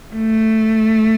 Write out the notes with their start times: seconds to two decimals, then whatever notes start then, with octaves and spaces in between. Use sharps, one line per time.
0.15 A3